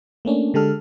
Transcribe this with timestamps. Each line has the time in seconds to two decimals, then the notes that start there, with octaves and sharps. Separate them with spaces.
0.25 A3 A#3 C#4 D4
0.54 D3 G#3 G4 A4 F6